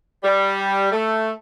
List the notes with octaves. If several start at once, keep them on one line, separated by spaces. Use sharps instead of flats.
G3
A3